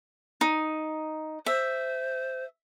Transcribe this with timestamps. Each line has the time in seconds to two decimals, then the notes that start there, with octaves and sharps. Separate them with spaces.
0.41 D#4
1.46 C5 E5